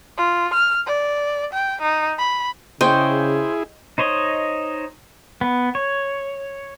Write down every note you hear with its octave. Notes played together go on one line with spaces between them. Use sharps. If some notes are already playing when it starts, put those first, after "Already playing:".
F4
F6
D5
G5
D#4
B5
C#3 E4 G#4 C5 D#5 G5 C#6
D#4 C5 C#5 D#5
B3
C#5